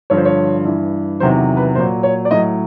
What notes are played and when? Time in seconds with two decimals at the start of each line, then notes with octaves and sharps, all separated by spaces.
0.10 G2 D3 F3 C#5
0.17 C5
0.25 C#5
0.65 G2 E3
1.20 E2 C3 D#3 F#3 C5
1.57 B4
1.75 A#2 F#3 C5
2.03 C#5
2.25 D5
2.31 A2 F#3 D#5